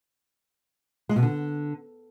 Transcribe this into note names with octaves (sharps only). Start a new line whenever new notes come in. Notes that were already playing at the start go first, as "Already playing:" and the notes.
G#3
B2
D3